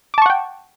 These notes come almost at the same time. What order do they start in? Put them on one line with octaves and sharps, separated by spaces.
D6 A5 C#6 F#5 G5